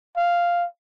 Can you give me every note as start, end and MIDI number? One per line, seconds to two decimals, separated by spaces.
0.17 0.66 77